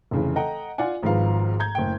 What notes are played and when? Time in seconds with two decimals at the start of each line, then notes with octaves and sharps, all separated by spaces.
0.11 F1 C#3 E3
0.36 A4 D#5 F#5 G5 A#5
0.78 F4 D5 F#5 G#5
1.03 G#1 G#2 D#3 F3 B4 F5
1.60 A#5 G6 G#6
1.75 F#1 A2 G5